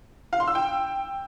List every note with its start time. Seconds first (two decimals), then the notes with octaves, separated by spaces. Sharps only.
0.33 F5
0.40 C6
0.48 E6
0.55 G5